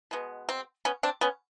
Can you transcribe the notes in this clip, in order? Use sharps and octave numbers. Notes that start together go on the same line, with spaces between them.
B2 G#3 B3
C4
B3 C#4
C4 D4
B3 C#4